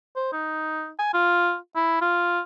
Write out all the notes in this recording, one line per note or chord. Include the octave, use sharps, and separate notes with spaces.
C5
D#4
G#5
F4
E4
F4